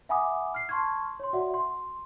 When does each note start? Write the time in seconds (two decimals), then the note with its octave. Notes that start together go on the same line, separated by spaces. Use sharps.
0.09 E5 F#5 G#5 B5 D6 D#6
0.54 F6 C7
0.69 A5 C6 C#6 F6 G#6
1.20 C#5 C6
1.33 F#4 D5 E5 F#5
1.54 C6